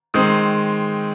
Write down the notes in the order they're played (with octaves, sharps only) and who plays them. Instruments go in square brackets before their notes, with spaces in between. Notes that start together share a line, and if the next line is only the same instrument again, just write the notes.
[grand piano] D#3 G#3 C4 D#6